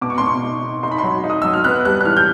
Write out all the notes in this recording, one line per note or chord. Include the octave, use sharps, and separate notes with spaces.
B2 D6
C#6
C6
B2
C#6
D#4
D#4
D#4 C6
B5
C6
F#3
D#4
D#6
F#3 E6
F6
B3 F#6
G3 F#6
F#6
E3 F6
G6